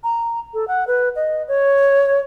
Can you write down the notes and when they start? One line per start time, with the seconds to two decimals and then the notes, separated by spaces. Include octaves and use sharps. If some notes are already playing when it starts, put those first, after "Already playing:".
0.04 A#5
0.54 A4
0.68 F#5
0.87 B4
1.16 D#5
1.48 C#5